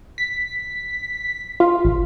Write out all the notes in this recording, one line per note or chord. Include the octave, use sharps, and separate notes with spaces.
B6
F4
G#1